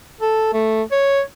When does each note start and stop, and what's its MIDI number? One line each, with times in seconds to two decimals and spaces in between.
0.21 0.51 69
0.53 0.82 57
0.91 1.21 73